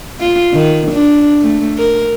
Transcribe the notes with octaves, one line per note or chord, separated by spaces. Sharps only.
F4
D#3
D4
A3
A#4